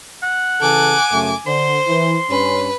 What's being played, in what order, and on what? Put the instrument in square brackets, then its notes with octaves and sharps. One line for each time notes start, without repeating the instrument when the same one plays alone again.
[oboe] F#5
[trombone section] C#3 E3 A4 [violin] G#5 D6
[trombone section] F#2 C#3 A3
[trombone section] D3 [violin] C5 [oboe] C6
[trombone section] E3
[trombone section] G2 C#4 [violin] B4